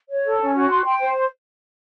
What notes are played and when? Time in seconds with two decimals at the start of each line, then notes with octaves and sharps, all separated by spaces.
0.09 C#5
0.24 A4
0.40 C#4
0.54 F#4
0.70 C6
0.85 G5
0.99 C5